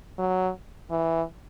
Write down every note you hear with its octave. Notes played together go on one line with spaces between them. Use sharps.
F#3
E3